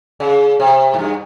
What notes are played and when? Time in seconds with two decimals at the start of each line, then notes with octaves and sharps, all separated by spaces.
0.20 C#3
0.60 C3
0.94 G#2
0.99 G2